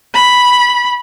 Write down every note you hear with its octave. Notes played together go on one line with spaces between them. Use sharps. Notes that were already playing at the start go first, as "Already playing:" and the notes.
B5